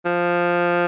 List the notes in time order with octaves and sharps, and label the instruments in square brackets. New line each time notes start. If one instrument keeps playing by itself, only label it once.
[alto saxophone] F3